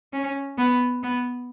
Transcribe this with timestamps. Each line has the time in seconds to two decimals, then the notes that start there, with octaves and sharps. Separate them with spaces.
0.13 C#4
0.58 B3
1.03 B3